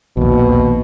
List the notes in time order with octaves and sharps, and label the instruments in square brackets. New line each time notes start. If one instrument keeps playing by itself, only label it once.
[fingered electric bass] A#1 D#2 [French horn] B2